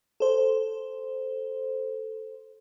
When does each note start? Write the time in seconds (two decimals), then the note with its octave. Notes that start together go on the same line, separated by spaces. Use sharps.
0.20 A4 C5